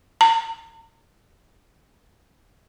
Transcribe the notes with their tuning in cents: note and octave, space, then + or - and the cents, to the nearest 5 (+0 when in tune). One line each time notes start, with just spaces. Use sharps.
A#5 -45